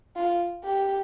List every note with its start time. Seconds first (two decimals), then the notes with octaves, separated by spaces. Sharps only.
0.16 F4
0.64 G4